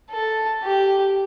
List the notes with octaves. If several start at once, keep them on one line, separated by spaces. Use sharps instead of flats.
A4
G4